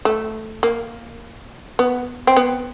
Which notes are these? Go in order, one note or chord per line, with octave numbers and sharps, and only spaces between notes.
A3
A#3
B3
C4
B3